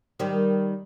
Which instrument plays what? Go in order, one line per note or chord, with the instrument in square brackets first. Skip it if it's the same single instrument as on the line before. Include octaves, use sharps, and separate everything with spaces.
[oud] D#3 G3